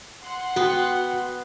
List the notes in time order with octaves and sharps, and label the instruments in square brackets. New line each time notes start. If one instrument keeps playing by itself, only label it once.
[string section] F#5 C6
[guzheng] B3 [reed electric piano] F#4 G5